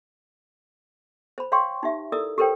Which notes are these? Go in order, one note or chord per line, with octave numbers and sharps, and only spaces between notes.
C5 B5
C#5 F5 G5 C6 C#6
D#4 G4 E5
E4 A4 A#4 D5 D#6 E6
G4 A4 A#4 C5 C#5 G5